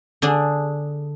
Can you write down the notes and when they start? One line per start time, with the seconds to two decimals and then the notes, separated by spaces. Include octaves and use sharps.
0.22 D3 D4 G#4